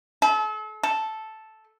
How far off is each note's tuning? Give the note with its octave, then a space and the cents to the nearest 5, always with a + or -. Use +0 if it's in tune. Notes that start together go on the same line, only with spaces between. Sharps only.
A4 -40
A4 -5